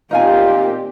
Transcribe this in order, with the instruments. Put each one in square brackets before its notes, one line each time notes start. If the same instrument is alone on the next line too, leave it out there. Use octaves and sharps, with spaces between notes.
[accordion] A#2 [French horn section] D#3 F4 [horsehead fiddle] C4 G4 [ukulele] D#4 F5 G#5